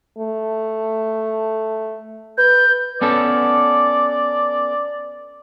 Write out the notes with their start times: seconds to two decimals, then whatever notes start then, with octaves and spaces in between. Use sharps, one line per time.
0.18 A3
2.38 B4 G6
3.01 B3 C#4 A4 D5